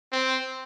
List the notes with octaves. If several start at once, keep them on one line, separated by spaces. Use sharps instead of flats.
C4